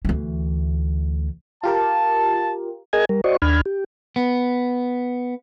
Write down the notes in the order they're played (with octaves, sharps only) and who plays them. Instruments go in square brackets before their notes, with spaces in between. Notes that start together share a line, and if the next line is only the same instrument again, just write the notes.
[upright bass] D2 E3
[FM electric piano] F4 G4 A#4 [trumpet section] A5
[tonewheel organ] G#4 A#4 D#5 G#5 G#6
G3 A#4
F#4 C5 D5 D#5 C#6
D#2 D4 B5 F6 G#6
G4
[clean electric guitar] B3